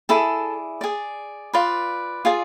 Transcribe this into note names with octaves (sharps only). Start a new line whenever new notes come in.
E4 G#4 A4 D5 A5
G#4 D5
F4 B4 D5
F4 G#4 D5